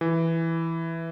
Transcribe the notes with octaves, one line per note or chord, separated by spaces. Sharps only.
E3